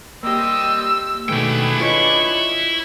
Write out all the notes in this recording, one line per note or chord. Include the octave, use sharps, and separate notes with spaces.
G3 A#3 C4 G4 D#5 E6
B2 D#3 A3 D4 E4 G#4 B4 G5
E4 F4 C#5 D#5 C#6